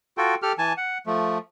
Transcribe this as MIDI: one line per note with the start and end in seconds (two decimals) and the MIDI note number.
0.18 0.35 65
0.18 0.35 66
0.18 0.35 69
0.18 0.35 79
0.42 0.53 67
0.42 0.53 69
0.42 0.53 89
0.58 0.73 52
0.58 0.73 80
0.58 0.73 81
0.77 0.98 78
1.06 1.38 53
1.06 1.38 57